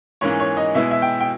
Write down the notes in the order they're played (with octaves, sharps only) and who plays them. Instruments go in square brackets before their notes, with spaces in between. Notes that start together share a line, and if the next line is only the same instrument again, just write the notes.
[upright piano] G#2 E3 A#3 C#4 C#5
C#5
D#5
B2 G#3 B3 E4 E5
E5
G5
G5